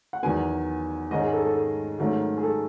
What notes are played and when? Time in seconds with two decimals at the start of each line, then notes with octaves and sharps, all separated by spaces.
0.13 F#5
0.23 E2 D#3 F#3 B3 G#5
1.11 G#2 D#3 G#3 C#4 D#5
1.22 G#4
1.33 A4
1.45 A4
1.56 A4
1.99 G#2 D#3 F#3 A3 C#4
2.38 G#4
2.43 A4